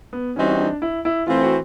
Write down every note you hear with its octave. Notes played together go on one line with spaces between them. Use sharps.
B3
E3 G3 C4 C#4 D#4 F#4
D4
E4
E4
E3 A3 C4 F4
F#4